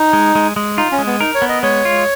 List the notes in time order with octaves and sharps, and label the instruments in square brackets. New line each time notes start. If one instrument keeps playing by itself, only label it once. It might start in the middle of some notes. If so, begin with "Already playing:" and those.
Already playing: [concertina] D#4
[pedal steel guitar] G#3
G#3
G#3
[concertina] D#4 [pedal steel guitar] F4
[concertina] C#4
[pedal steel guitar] G#3
[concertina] B3
[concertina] D#4 [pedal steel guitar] A#4
[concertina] C#5
[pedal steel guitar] B3
[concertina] D#5
[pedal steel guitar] G#3 [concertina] C#5
[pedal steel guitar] F4